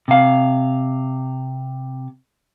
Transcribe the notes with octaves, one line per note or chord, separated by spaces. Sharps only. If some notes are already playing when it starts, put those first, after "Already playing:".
C3 F5